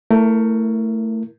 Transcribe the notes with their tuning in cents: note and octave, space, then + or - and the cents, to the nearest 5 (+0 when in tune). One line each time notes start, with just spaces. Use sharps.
A3 +20 E4 +0 A#4 +0